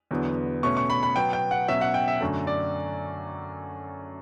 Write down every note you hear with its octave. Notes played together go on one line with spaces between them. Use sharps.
E2 D3 F#3 B3
B2 A3 C#4 C#6
C#6
B5
B5
B2 F#3 B3 G5
G5
F#5
B2 F#3 C#4 E5
F#5
G5
E5
F#2 D3 F#3 A3
D5